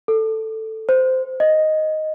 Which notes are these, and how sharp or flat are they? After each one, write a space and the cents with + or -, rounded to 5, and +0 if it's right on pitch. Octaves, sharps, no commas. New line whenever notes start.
A4 +5
C5 -15
D#5 +0